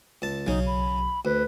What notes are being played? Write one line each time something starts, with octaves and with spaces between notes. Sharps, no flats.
C#2 A5
B1 C#3 F#3 C#4 D#4
B5
D2 B4